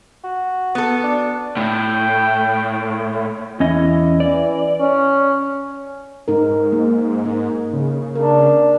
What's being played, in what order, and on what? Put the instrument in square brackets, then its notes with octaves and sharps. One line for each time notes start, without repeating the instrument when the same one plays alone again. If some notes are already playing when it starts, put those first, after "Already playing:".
[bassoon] F#4
[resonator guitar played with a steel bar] B3 A4
[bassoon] D4
[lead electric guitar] A2 [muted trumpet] G5
[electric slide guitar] E2 C#4 D#5 [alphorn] E4
[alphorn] E3 [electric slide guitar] D5
[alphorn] C#4
[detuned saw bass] G#2 [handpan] D#4 A#4
[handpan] A#3
D#4 A#4
[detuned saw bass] C#3
[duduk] D4 [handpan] A#4